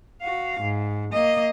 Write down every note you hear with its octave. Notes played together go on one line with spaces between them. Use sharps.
F#4 F5
G#2
A#3 D#5